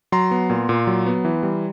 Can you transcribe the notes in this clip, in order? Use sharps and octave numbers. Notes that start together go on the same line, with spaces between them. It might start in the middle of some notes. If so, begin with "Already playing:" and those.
F#3 A#5 C6
B3
A#2
A#2
F#3
B3
E3
G3